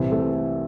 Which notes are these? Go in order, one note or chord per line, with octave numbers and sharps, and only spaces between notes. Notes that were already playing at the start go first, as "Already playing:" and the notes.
Already playing: C2 C3 E3 C4 C5
A3 A4